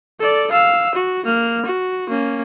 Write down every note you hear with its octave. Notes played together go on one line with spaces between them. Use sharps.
A4 D5
F5 E6
F#4
A#3 F6
F#4
A#3 C#4